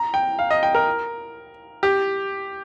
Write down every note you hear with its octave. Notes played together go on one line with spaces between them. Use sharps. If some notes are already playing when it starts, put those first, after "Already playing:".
Already playing: A#5
G5
F5
D#5
G5
A#4
G4